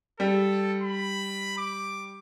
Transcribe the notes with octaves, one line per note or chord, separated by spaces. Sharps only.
G3 A4
B5
D6